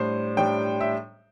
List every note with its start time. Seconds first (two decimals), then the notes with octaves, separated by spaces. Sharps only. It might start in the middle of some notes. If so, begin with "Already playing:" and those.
Already playing: A2 G3 D4 C5
0.37 A2 G3 D4 G5
0.81 E5